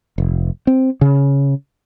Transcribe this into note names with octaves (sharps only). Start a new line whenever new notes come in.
F1
C4
C#3